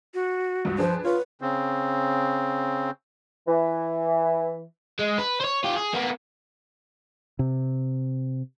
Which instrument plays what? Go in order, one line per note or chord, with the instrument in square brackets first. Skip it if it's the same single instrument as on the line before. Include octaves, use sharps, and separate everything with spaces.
[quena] F#4
[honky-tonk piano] C#2 G2
[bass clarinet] F3 [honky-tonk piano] D4 G#4 B4 [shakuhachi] C5
[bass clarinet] F4 [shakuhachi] B4 [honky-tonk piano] C#5
[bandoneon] C#3 C4
[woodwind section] E3
[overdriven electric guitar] G#3
B4
C5 C#5
F4 G4
G#4
A#3 B3
[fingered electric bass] C3